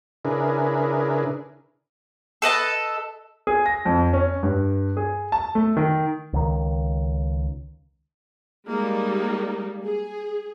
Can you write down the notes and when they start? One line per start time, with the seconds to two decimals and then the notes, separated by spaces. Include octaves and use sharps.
0.25 C#3 D4 E4 G#4 A#4 B4
2.42 A4 B4 D#5 A5
3.47 G#4
3.66 A#6
3.85 F2
4.13 C#4
4.43 G2
4.97 G#4
5.32 A5
5.55 A3
5.77 D#3
6.33 C#2 D#3
8.68 G3 G#3 A#3 D#4
9.84 G#4